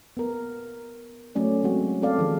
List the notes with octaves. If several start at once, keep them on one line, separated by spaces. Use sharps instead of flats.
B3 A#4
F#3 A3 C#4 D5
F#3 G#3 C4 F#4
C4 A4 D5 F5
D#3 F3 F#3 C4 G#4